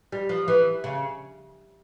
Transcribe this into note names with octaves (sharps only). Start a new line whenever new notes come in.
G3
F3
E3
C#3